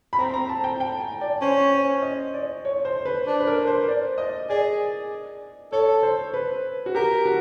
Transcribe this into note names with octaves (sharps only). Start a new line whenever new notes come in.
B5
C4 A#5
A#5
A5
G5
G5
G#5
D5
C#4 C5
C#5
D#5
D5
C#5
C5
B4
D4
B4
A#4
C5
D5
D#5
G#4 D5
A4 C#5
C5
B4
F#4
G4 A#4
F#4